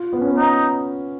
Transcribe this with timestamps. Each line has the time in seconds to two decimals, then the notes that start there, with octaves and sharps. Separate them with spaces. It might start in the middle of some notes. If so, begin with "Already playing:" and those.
Already playing: F4
0.13 B3
0.21 C#4
0.31 B3
0.37 D#4